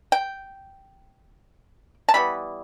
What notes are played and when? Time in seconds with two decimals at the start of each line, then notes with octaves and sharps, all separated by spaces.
0.12 G5
2.09 A5
2.14 E3 G3 B3 B5